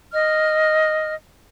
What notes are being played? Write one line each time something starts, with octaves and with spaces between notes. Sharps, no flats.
D#5 F6